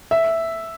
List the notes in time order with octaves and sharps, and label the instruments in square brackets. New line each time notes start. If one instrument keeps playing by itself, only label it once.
[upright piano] E5